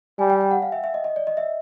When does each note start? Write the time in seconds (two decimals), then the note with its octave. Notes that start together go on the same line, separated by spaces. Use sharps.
0.19 G3 G#5
0.30 G5
0.41 G5
0.51 F#5
0.62 F5
0.72 E5
0.84 E5
0.94 D#5
1.04 D#5
1.16 D5
1.27 D#5
1.37 E5